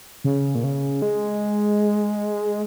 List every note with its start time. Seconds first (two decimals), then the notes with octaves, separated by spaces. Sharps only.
0.24 C#3
0.55 A#2
0.64 C#3
1.02 G#3